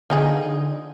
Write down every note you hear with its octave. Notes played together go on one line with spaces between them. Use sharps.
D3 F3 D#4 G#4